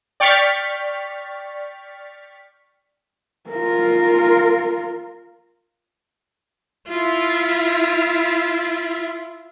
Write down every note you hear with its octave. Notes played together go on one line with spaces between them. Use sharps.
D5 G5 C#6 F6 A6 B6
F4 A#4
E4 F4